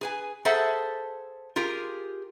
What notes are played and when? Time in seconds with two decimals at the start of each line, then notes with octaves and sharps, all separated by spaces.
0.01 G#4 B4 G#5
0.45 G#4 A4 C5 E5 F#5 A5
1.56 F4 G4 G#4 A#4